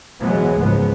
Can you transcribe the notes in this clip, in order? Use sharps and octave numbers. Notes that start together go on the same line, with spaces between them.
B2 E3 F#3 G#3 B3
C#2 G#2 F3 B3